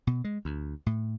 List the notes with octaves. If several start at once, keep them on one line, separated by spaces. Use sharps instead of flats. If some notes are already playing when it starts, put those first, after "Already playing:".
B2
G#3
D2
A2